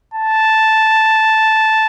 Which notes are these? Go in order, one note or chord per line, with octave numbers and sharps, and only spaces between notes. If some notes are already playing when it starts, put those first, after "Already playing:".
A5